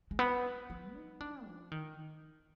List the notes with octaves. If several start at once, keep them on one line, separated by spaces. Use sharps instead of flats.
G#3
B3
F3
D#4
D4
F3
D#3